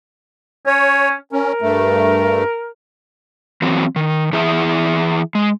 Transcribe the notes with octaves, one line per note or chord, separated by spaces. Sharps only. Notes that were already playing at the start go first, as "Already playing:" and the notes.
C#4 C#5
C#4 A#4
G2 A3
E3 F#3 C4
D#3
E3 E4 G#4 E5
G#3